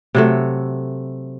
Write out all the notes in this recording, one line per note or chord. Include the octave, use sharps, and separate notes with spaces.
C3 F#3 A3